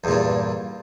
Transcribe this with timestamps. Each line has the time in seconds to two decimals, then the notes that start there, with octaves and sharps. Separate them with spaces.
0.04 E2
0.07 A#2
0.11 G2